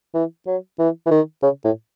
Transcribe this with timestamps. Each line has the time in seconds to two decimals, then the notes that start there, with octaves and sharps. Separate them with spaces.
0.14 E3
0.46 F#3
0.79 E3
1.06 E3
1.11 D#3
1.42 C#3
1.64 A2